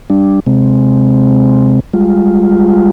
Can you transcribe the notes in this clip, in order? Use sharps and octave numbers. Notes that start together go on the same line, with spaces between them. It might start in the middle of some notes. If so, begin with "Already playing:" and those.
G3 D4
C3 G#3 C4
G3 G#3 F4